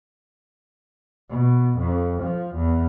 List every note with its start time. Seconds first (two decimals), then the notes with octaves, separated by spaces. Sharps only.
1.30 B2
1.78 F2
2.23 F3
2.56 E2